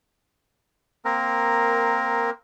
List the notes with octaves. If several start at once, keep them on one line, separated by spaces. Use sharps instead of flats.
A#3 C4 A#4